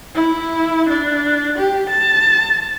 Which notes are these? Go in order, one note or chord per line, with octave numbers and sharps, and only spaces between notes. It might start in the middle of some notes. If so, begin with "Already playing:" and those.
E4
D4
G4
A5